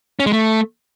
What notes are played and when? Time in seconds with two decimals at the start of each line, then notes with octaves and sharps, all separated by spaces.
0.20 C#4
0.26 G#3
0.33 A3